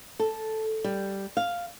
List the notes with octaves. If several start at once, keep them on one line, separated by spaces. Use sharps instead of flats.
A4
G3
F5